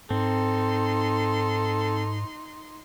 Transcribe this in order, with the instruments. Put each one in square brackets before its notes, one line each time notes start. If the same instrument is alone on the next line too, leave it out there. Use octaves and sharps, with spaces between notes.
[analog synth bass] G#2 [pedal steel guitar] C4 [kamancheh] D#4 C6 [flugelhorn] A4